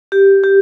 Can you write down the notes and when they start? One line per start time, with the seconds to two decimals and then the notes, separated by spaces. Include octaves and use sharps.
0.12 G4
0.43 G4